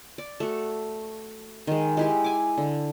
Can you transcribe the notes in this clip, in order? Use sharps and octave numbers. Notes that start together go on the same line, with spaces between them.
D5
A3 F#4
D#3 G#3
G#3 E4 G4
G#5 D6
D3